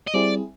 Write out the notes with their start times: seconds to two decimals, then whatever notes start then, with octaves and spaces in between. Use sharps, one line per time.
0.07 D#5
0.14 G3 C4 E4 G#4 D5